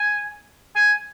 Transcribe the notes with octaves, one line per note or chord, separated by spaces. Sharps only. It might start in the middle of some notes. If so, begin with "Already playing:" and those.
Already playing: G#5
G#5